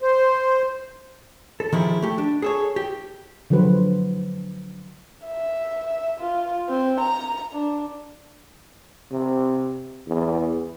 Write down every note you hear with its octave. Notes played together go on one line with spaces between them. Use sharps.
C5
A4
D#3 F3 E4 G4 G#4
A3 G4
D4
G#4 A4 C#5
G4
D3 F3 F#3 F#4 B4 C5
E5
F4
C4
A#5
D4
C3
E2